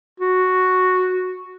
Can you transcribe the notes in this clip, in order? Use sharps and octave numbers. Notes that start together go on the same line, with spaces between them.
F#4